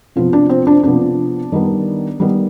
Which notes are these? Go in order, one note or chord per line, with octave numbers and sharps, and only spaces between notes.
C3 F3 B3 F4
D4
C4
D4
C3 F3 B3 D4
D#3 G3 B3
D#3 G3 B3